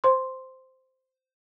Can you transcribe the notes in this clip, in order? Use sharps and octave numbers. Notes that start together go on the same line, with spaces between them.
C5 C6